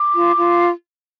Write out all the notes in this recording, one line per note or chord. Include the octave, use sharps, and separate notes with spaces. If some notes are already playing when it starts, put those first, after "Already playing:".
Already playing: D6
F4
F4